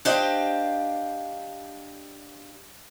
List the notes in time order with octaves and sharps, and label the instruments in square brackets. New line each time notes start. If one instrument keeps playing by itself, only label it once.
[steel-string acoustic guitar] D4 G4 C5 D#5 F5